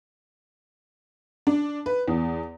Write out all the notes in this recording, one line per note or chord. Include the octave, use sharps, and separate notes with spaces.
D4
B4
E2